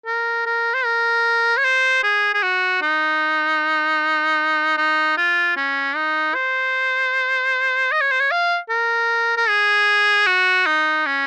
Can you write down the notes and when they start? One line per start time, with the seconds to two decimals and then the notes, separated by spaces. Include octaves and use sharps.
0.06 A#4
0.46 A#4
0.74 C5
0.85 A#4
1.57 C#5
1.64 C5
2.03 G#4
2.34 G#4
2.42 F#4
2.82 D#4
4.77 D#4
5.17 F4
5.57 C#4
5.95 D#4
6.34 C5
7.91 D#5
8.01 C#5
8.11 C5
8.20 C#5
8.31 F5
8.69 A#4
9.37 A#4
9.48 G#4
10.26 F#4
10.66 D#4
11.06 C#4